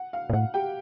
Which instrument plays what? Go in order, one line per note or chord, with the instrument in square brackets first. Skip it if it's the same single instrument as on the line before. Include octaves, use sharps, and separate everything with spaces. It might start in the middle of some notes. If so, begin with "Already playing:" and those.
Already playing: [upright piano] F#5
F5
[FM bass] A#2
[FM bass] A2 [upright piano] F#5
[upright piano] G4 G5